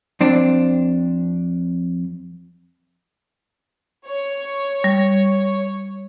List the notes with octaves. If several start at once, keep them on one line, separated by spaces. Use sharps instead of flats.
F2 C4 D4
C#5
G3